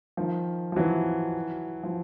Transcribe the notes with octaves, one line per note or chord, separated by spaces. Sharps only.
D#3 F3
F3
E3 F#3
F3